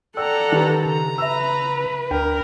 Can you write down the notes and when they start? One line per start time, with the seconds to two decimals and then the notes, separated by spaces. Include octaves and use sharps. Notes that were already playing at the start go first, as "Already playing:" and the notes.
0.17 A4 D5 F#5 G5 A#5 E6
0.52 D#3 G4 B4
0.85 C#3 A#5
1.18 B4 E5 E6
2.11 D2 D4 A#4 G5